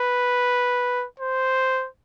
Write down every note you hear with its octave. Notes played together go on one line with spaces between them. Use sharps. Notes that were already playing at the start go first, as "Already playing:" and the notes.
Already playing: B4
C5